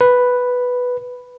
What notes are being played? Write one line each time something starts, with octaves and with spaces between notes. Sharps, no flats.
B4